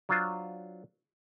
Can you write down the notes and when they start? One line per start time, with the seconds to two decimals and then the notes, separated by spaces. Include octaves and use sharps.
0.09 F#3 D4 F4 C5